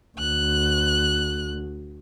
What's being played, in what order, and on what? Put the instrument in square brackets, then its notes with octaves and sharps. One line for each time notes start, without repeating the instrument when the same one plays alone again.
[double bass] D2 [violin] F#6